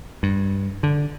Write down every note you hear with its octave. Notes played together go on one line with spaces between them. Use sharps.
G2
D3